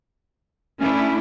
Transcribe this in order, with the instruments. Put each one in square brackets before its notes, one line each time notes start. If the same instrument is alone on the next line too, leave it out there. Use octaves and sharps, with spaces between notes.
[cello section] A3 D4 E4 [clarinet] C#4